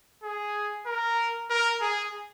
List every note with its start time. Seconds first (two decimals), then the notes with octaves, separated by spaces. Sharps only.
0.23 G#4
0.86 A#4
1.50 A#4
1.81 G#4